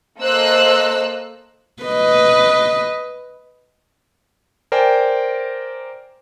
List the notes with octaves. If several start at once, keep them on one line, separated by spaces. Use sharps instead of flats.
A#3 A4 C5 D#5 E6 F#6
B4 D#5
A#4 C5 D5 G5 G#5